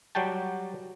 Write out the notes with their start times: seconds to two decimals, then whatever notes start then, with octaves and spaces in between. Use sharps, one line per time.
0.15 F#3 G3 F#4 G5 A5